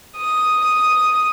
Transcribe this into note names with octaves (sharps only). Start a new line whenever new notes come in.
D#6